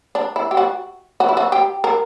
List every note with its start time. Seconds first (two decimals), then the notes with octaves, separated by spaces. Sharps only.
0.15 D4
0.36 E4
0.51 G4
0.57 F#4
1.20 F#4
1.29 E4
1.37 F#4
1.52 G4
1.84 A#4